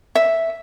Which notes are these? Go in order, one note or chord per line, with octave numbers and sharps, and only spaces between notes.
E5